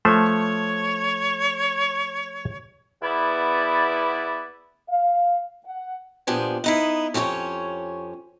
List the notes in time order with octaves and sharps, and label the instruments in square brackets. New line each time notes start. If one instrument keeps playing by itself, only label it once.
[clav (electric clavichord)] F3 A3 C5 [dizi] C#5
[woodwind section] E2 B3 E4 D5
[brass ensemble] F5
F#5
[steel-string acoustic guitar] A#2 F3 B3 D4 G4 G#5
B3 D#4 E4
F2 C#4 G4 A4 C#5